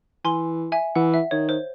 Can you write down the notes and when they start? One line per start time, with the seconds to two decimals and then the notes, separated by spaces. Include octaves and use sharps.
0.25 E3 G#5 C6
0.72 E5 G#5
0.95 E3 F#5
1.14 E5
1.31 D#3 C#5
1.49 C5